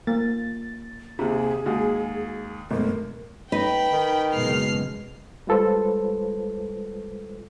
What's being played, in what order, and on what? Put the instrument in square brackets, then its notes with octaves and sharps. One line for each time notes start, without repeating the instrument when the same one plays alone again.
[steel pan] A#3 [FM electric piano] A6
[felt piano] D#2 C3 [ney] G#4
[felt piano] D#2 G#3 [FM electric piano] F#4
[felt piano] G#1 [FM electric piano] F#2 B2 A3 [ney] A#4
[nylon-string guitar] D#4 B4 [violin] G5 B5
[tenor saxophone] D#3
[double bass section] F#1 B2 G#3 [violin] F6 C7
[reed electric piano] G3 G#3 F4 A4 B4 C5